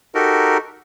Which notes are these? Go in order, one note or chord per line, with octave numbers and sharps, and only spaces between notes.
D#4 F#4 G4 A4 A#4